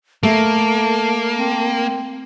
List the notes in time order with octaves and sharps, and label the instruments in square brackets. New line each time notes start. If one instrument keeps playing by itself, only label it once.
[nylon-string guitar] A3 [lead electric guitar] A#3 [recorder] A5
[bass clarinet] C4